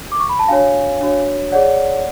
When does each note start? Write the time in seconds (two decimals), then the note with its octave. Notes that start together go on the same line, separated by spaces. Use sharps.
0.12 D6
0.20 C#6
0.29 B5
0.39 A5
0.48 D4 F#4 C#5 F5 G#5
1.01 D4 F#4 C#5
1.52 G#4 C#5 D5 F#5